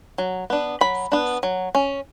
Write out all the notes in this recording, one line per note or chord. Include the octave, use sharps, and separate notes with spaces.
F#3
B3 D4
F#3 B5
B3 D4
F#3
C#4